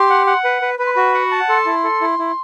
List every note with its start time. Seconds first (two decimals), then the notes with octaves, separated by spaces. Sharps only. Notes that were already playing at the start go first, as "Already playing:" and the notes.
Already playing: G4 C6
0.10 F#5
0.27 F#5
0.44 B4
0.62 B4
0.79 B4 B5
0.86 C6
0.93 F#4 B5
1.14 F#5
1.31 A5
1.49 A4 C6
1.66 E4
1.84 A4
2.01 E4
2.19 E4